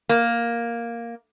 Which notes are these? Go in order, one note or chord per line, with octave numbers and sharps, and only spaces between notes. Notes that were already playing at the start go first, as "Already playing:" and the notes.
A#3